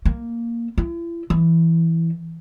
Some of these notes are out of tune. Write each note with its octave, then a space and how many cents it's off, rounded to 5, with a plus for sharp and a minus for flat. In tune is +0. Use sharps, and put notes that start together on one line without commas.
A#3 +0
E4 +40
E3 +0